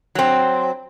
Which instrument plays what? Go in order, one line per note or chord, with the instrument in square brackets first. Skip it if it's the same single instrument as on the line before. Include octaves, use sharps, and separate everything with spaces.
[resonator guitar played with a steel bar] F#3 C4